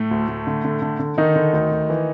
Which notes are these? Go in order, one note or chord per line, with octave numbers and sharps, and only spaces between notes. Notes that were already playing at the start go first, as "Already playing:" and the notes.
Already playing: A2 A3
D2
D2
D3
D3
D3
D3
D3 D#3 D#4
D3
D2
D2
E3